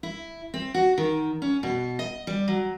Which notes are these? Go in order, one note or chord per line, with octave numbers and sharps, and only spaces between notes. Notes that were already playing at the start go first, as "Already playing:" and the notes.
E4
C4
F#4
D#3
C#4
B2
D#5
G3
F#3